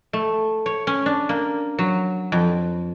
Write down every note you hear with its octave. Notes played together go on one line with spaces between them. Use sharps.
A3
C#5
C#4
D4
A#3
F#3
F2